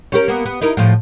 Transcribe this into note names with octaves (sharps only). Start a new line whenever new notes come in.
C#4 G4 A#4
A#3 B3
B3
D#4 E4 A#4
A2 F3